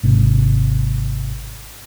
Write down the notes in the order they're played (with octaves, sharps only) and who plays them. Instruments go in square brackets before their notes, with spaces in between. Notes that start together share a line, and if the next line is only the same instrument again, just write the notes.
[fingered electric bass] G#1 C3